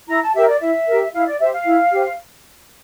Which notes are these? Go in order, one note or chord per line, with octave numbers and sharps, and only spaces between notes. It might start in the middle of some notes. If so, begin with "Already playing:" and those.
E4 A#5
A5
G4 A#4 E5
D5
E4 E5
G4 A#4
E4 F5
D5
G4 C5 E5
F5
E4
G4 C5